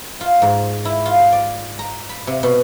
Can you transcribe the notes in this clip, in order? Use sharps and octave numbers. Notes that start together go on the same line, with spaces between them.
F4
G#2
E4
F4
D5
A#5
B5
C3
B2